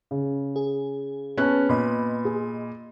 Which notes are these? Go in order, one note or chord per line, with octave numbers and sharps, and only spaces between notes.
C#3
G#4
B3 C#4 A5 F#6
A#2 D#5 B5 C6
G#4